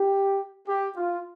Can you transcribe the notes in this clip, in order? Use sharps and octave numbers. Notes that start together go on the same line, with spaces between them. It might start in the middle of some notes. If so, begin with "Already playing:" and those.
Already playing: G4
G4
F4